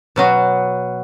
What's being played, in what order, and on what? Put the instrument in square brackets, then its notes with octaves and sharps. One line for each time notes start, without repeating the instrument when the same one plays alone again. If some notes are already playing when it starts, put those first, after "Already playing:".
[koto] B2 F#3 B3 F#4